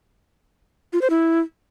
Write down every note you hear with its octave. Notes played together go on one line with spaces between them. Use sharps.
F4
C5
E4